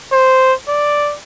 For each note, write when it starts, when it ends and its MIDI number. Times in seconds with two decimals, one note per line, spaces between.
0.12 0.53 72
0.68 1.15 74